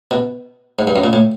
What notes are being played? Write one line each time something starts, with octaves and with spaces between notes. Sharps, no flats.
B2
G#2
G2
F#2
A#2
A2